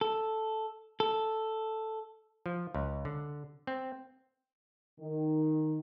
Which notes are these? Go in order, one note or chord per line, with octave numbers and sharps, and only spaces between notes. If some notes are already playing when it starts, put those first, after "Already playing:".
A4
A4
F3
C#2
D3
C4
D#3